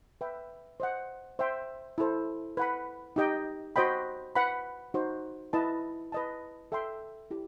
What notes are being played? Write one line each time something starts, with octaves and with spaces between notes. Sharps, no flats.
B4 E5 G5
C5 D#5 F#5
C5 E5 G5 C6
E4 A4 C5
B4 F#5 B5
D#4 G4 D#5 G5
F#4 C5 D#5 G5 B5
B4 F#5 B5
D#4 F#4 C5
E4 B4 D#5 A5
B4 D#5 A5
A4 E5 G5 C6
E4 G4